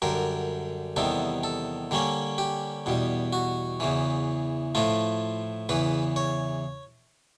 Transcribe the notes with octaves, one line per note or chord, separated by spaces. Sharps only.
F#2 D3 G3 A#4
E2 C3 D#3 G3 B3 A4
A4
D3 G3 A#3 C#4
G4
E2 B2 G3
F#4
E2 C#3 E3
A2 F3 A3 F4
E2 C#3 E3 B4
C#5